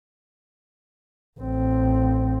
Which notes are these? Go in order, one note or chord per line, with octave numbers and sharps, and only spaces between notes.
A1 C4